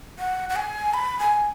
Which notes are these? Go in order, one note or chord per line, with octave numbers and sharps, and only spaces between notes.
F#5
F#5
G#5
B5
G#5